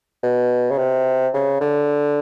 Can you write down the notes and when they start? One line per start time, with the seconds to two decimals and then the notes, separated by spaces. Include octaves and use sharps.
0.23 B2
0.71 C#3
0.78 C3
1.34 C#3
1.61 D3